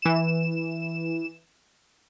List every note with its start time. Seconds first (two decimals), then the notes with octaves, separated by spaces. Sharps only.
0.02 E3 E7